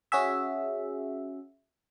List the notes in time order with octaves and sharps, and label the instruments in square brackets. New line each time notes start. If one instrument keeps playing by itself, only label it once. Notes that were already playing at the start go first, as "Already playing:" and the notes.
[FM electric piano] C#4 F#4 G#4 E5